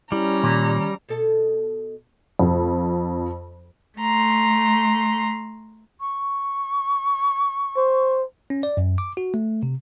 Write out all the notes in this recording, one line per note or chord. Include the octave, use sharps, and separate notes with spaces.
G3 C#4 E4 A#5
A#2 D#3
B2 A4
F2
A3 A#5 C6
C#6
C5
C#4
D5
F#2
D6
F#4
A3
C3